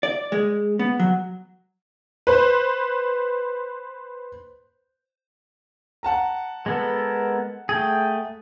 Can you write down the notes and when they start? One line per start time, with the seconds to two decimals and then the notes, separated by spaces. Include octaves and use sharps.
0.03 D5
0.32 G#3
0.79 B3
1.00 F#3
2.27 B4 C5
6.03 F#5 A5 A#5
6.66 G#3 B3 A4 A#4
7.69 A3 G#4 G5